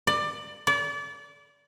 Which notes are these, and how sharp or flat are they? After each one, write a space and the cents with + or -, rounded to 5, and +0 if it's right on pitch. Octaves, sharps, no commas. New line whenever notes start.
D5 +20
D5 -30